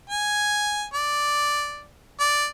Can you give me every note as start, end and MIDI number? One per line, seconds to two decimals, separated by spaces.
0.10 0.84 80
0.94 1.87 74
2.20 2.46 74